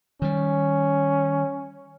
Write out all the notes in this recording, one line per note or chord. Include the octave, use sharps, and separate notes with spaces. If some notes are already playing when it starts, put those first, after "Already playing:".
D#3 G3 C#4